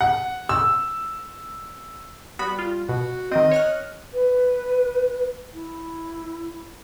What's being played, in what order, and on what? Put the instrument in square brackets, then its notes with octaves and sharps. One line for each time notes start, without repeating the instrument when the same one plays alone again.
[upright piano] F#5
E6
[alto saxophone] G3 [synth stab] B3 F#4 B5
[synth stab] F4
[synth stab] B2 [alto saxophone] F#4
[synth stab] D#3 C4 [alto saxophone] D#5
[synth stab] C#5 F6 F#6
[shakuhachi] B4
E4